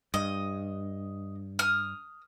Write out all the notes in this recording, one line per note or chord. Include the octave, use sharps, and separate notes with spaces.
G2 D#5
D#6 F6